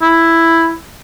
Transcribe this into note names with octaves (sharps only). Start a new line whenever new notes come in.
E4